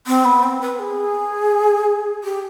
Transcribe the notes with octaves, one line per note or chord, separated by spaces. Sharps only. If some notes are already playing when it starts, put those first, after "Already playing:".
C4
B3
C4
B4
G#4
G4